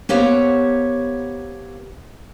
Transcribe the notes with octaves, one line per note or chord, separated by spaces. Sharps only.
A#3 B3 G4 C5 C#5 F#5